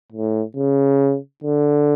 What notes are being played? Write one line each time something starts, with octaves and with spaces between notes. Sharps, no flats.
A2
C#3
D3